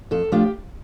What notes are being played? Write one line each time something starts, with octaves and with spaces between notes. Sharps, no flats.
F2 A4
F3 A3 D4 F4 G4